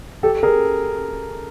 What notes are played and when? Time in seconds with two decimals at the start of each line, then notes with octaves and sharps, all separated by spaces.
0.23 G4 A4
0.43 G#4 A#4